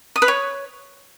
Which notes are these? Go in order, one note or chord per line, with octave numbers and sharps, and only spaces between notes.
D#6
B4
C#5